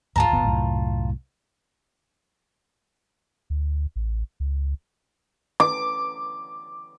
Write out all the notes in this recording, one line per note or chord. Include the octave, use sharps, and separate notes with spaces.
D2 G#2 G#3 F4 A5 A#5
D1 G1 B3
C2 F#2 A2
D2
A1
C#2
D6